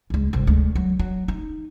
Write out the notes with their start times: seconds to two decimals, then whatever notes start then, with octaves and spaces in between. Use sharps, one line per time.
0.10 C#2 G#3
0.33 G1 C2
0.47 D2 G#3
0.75 F#3
0.99 F#3
1.28 D#4